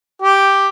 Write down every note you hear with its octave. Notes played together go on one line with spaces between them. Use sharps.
G4